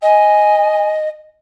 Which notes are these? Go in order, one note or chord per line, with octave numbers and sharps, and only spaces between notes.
D#5 G#5